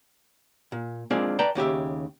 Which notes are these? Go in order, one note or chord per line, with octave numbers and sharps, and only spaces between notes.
A#2
G#3 A#3 C4 D4 F4 G#4
B4 D5 G5 A5 A#5
D#2 C#3 G4 E5